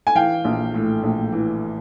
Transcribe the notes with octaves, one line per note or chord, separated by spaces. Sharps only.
G#5
E3 F5 G5
A#1
A2
A#1
E3